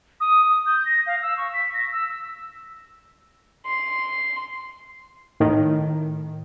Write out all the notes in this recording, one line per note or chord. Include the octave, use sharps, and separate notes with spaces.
D#6
D#6
G6
A#6
F5
E6
C#6
B6
A#6
E6
E6
C6
A2 D#3